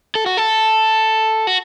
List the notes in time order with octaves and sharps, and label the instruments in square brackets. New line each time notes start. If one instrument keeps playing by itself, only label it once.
[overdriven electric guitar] A4
F#4
A4
F#4